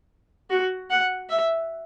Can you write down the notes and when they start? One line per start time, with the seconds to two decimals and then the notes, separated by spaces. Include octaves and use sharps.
0.50 F#4
0.90 F#5
1.30 E5